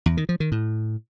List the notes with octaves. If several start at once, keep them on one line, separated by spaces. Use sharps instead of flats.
E2
D#3
F3
D#3
A2